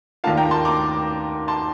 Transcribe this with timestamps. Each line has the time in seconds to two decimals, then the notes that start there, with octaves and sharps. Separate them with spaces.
0.24 D#2 D#3 A#3 D4 F4 F5 A5
0.37 G5 A#5
0.51 A5 C6
0.65 A#5 D6
1.48 A5 C6